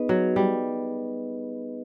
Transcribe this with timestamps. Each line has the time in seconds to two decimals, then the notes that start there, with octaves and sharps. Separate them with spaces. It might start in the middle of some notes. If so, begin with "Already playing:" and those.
Already playing: B3 D#4 G#4 B4 D#5
0.09 F#3
0.36 G3